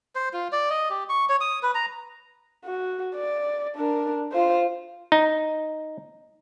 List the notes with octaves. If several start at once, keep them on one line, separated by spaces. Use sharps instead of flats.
C5
F4
D5
D#5
G4
C#6
C#5
D#6
B4
A#5
F#4
D5
D4 A#4
F4 C5
D#4